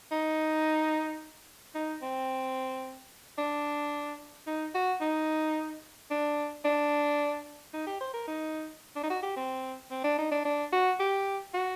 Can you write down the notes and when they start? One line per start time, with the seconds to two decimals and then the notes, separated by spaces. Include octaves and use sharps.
0.12 D#4
1.75 D#4
2.02 C4
3.38 D4
4.47 D#4
4.75 F#4
5.01 D#4
6.11 D4
6.65 D4
7.74 D#4
7.87 G4
8.01 C5
8.14 A#4
8.28 D#4
8.96 D4
9.03 D#4
9.10 F#4
9.23 G4
9.36 C4
9.91 C4
10.04 D4
10.18 D#4
10.31 D4
10.45 D4
10.72 F#4
11.00 G4
11.54 F#4